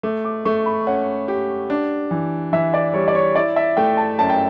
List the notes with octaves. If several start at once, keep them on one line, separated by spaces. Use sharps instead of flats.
A3 D6
D6
A3 C#6
B5
C#4 F#5
G4
D4
E3
E3 E5
D5
G3 C#5
D5
C#5
E4 D5
E5
A3 G5
A5
F#2 A5
G5